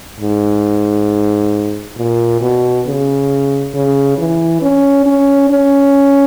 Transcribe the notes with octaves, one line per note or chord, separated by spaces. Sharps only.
G#2
A#2
B2
C#3
C#3
E3
C#4
C#4
C#4